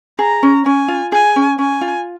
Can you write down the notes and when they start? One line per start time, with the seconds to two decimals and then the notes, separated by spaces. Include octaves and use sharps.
0.19 G#4 A#5
0.43 C#4
0.66 C#4 G#5
0.88 F4
1.12 G#4 G#5
1.36 C#4
1.59 C#4 G#5
1.81 F4